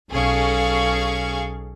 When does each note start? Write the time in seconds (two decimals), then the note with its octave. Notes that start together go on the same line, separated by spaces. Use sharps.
0.10 B1 C#4 G#4 A4 F5 C#6